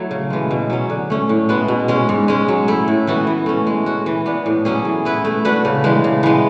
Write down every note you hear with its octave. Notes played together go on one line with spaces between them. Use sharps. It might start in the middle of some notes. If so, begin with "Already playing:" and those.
Already playing: F#3 A3 E4
C#3
E3 G#3
B2
F#3 C#4
D3
A3 C#4
A2
G#3 B3 F#4
B2
G#3 C#4
G#2
G#3 C#4
F#3
A3 E4
A2
E3 B3 F#4
E3
A3 C#4
G#3
C#4 F#4
E3
B3 D4
A2
F#3 C#4 G#4
E3
B3 E4 B4
A3
D4 F#4 B4
C#3
E3 G#3 D4
C#3
E3 G#3 B3